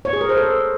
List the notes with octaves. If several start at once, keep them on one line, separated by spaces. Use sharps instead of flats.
C#5
G#4
A#4
C5
A4